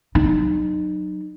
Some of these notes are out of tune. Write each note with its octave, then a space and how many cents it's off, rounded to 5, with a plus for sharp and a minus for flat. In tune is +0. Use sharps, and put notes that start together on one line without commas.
F#3 +0 D#4 -35